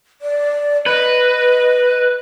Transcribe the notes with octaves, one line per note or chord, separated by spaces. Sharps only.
D5
B4 D#5